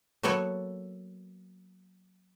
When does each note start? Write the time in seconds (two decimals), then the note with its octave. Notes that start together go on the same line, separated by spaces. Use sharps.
0.23 F#3 A#3 B3 A4 C#5